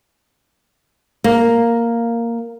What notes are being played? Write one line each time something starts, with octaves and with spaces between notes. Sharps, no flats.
A#3